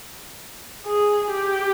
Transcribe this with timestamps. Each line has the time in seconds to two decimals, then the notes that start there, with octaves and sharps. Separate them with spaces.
0.86 G#4
1.32 G4